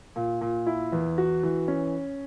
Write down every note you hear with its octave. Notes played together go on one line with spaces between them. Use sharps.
A#2
A#2
E4
E2
F#4
E3
C#4